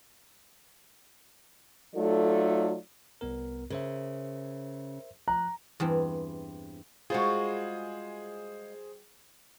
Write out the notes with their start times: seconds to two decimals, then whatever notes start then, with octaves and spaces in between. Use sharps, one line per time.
1.96 F#3 A3 D#4 F4 A4 D5
3.21 C2 B3 A#4
3.70 C#3 A#4 C5 E5
5.28 F3 A#5 F#6
5.80 E2 G2 C4
7.10 G3 G#3 F4 F#4 G#4 C5